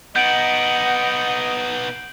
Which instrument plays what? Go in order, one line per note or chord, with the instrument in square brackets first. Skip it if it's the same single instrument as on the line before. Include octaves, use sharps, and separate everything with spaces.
[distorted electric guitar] B3 D#4 [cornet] D#5 [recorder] F#5 [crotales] G6 D7 F#7